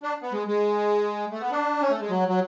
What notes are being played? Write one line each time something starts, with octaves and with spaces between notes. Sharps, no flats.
D4
B3
G#3
G#3
A3
B3
D4
C#4
A3
G#3
F#3
F#3